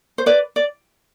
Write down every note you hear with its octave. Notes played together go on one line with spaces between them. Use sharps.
C5
B4 D5
D5